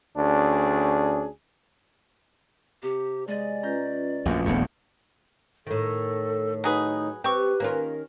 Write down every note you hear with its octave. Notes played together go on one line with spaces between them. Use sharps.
D2 C#4 D4 G#4
C3 G4
G#3 G#4 D5 D#5
C#4 F4 B4 A#5 G6
A#1 F#2 A3 D4 F#4
D#1 A#1 E2 A2 B3 C#5
A2 D#3 A4
F#3 D#4 G#4 B4
C4 G4 B4 C#6
D#3 A#3 C#4 F4 A#4